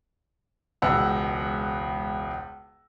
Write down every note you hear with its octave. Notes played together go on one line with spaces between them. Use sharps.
E1 C#2 F#5 E6